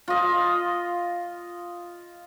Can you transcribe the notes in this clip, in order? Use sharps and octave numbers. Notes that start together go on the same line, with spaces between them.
F4 D#5